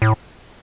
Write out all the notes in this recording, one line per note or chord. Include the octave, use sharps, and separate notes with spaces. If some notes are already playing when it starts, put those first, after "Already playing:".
A2